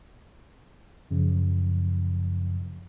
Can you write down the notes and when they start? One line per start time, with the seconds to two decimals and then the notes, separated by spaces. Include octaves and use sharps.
1.11 F#2 C#3 F3